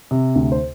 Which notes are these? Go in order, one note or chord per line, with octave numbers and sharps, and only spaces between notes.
C3
D2
C5